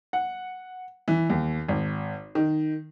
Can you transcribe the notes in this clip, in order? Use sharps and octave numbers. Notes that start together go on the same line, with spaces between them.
F#5
E3
D#2
G#1
D#3